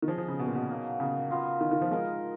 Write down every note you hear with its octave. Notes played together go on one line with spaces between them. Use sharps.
D#3
F3 C#4 G#4 D#5
F3
C#3
B2
A#2
B2
F#3 A#3 D#4
C#3
B3 F4 A#4
D#3
D#3
F3
G#3 D#4 A#4 D#5